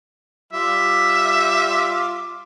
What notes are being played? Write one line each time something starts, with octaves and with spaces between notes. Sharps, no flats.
G3 F4 E5 D6